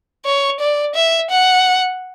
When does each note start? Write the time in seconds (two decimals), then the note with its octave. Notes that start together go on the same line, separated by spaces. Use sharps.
0.25 C#5
0.60 D5
0.95 E5
1.30 F#5